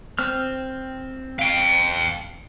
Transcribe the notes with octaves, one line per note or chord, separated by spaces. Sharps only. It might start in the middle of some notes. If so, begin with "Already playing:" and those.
C4 F6
F5 G5